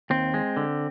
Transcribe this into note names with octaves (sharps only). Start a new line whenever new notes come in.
D#2 C4
G#3
D3